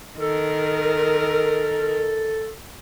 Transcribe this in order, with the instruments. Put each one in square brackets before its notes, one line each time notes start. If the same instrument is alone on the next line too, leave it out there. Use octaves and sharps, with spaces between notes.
[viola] D#3 A#4 [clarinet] A4